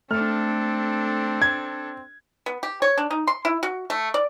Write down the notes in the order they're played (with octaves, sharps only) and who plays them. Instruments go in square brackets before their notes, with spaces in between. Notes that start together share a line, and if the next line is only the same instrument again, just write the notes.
[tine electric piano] A3 [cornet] C4 [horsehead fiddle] D4 A4 [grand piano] F6
[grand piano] G#6
[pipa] B3
G4
C#5
D4
D#4
C6
E4
F#4
A3
D5